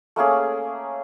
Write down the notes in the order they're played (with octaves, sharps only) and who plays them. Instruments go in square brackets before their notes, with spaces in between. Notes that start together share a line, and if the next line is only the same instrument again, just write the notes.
[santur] A3 A#3 C#4 G#4